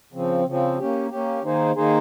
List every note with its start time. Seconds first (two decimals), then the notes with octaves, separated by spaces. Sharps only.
0.12 C#3 F3 C4
0.45 C#3 F3 C4
0.78 A#3 C#4 G4
1.10 A#3 C#4 G4
1.43 D#3 A#3 D#4 G#4 C5
1.75 D#3 A#3 D#4 G#4 C5